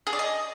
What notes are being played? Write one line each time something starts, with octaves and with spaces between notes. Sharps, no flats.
G#4
D5
D#5